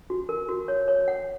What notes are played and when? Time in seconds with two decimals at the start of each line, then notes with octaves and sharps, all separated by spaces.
0.10 F#4
0.29 A#4
0.49 F#4
0.68 C#5
0.88 C#5
1.08 F#5